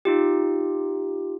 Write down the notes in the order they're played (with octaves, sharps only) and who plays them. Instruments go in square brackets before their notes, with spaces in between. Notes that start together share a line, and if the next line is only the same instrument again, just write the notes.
[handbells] D#4 F4 G4